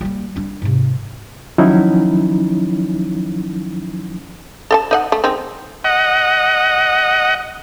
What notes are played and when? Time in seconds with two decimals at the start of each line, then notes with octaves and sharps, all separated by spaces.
0.01 G3 A#3
0.36 G3 D4
0.62 G#2 C3
1.58 D#3 F3 F#3 C#4 D#4 E4
4.71 A4 G5 A5
4.91 D#4 D#5 F#5
5.12 A3
5.24 D#3 G#3 C4
5.84 D#5 F#5